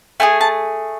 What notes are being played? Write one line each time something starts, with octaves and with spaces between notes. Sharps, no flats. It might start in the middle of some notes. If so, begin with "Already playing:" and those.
A3 E4 G#4 G#5
A5